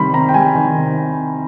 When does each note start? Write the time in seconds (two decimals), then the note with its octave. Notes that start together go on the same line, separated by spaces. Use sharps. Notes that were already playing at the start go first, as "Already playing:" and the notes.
Already playing: C3 D#3 G3 B5 C6
0.14 C3 A#5
0.29 G5
0.34 G3 G#5
0.55 D#3
0.75 C3